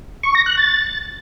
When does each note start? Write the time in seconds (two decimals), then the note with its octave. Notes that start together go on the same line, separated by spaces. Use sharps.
0.23 C#6
0.35 A#6
0.46 F#6
0.58 A6